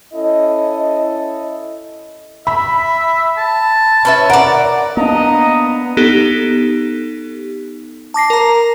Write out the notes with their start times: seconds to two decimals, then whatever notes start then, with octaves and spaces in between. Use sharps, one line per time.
0.14 C#4 E4 A4 D#5
2.47 E5 B5
3.37 A5
4.05 C#4 B4 E5
4.30 A#4 D5 F#5
4.97 A#3 B3 D4 D#5 A#5
5.97 B3 D#4 G4 A4
8.14 A5 D6 A#6 C7
8.30 A#4 A#5